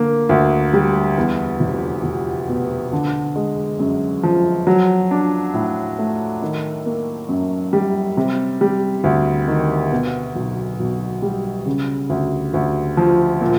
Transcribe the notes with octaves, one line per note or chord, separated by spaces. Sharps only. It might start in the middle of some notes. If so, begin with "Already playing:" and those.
Already playing: D3 A#3
D2
G3
E2
F1
F1
B2
D3
G#3
F#2
F3
F#3
D4
A2
A3
D#3
A#3
F#2
G3
C3
G3
D2
D#3
B2
B1
B1
G3
C#3
D2
D2
F3
A#2